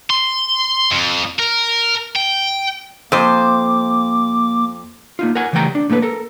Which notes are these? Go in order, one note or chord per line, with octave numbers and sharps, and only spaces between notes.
C6
F2
A#4
G5
F2 A#3 C5 D6
A#3 D#4 F4
A#4 F#5 G#5
C#3 E3 G3 A3 G5 A#5
D4
A2 A#3 A4 B4
A4 A#4